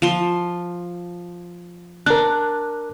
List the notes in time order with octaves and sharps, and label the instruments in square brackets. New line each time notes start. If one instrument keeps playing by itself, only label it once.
[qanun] F3 C6
[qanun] D4 [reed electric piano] A#4 F#6